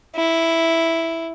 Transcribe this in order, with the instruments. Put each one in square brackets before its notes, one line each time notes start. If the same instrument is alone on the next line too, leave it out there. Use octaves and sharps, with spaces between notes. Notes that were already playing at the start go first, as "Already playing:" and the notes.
[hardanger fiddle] E4